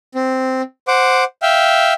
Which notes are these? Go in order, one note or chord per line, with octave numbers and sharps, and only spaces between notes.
C4
C5 F#5 D6
E5 F5 G5